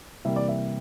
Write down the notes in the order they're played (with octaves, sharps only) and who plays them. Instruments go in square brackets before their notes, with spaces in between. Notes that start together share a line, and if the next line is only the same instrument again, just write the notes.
[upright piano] C3 E3 G3 A#3 E5
D5
E5